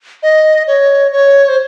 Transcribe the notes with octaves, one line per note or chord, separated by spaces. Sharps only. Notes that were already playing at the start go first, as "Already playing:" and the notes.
D#5
C#5
C#5
C5